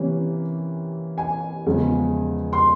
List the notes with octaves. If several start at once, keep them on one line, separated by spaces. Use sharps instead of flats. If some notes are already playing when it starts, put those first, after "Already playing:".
Already playing: C3 E3 A#3 C#4
G#5
E2 C#3 F3 G#3
C6